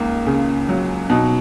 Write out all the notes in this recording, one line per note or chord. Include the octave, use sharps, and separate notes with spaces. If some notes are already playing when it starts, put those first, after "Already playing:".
Already playing: C#2 A#3 D#4
C#3
F#3
B2 D#4